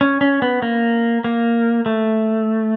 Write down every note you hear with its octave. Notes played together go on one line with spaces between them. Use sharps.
C#4
C#4
B3
A#3
A#3
A3